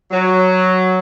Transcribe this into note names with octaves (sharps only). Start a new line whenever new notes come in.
F#3